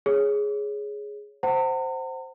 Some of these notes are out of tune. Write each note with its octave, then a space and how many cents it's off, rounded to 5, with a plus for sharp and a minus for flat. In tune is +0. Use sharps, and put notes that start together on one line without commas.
G#4 +0 C#5 +0
C5 +0 F#5 +20 A#5 -45